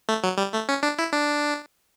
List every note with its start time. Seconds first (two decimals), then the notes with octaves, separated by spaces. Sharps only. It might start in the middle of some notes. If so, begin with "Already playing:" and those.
0.09 A3
0.24 F#3
0.38 G3
0.53 A3
0.69 C#4
0.83 D4
0.99 E4
1.12 D4